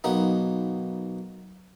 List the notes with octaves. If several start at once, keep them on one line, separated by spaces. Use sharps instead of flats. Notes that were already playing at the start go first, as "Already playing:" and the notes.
B1 A#3 B3 D#4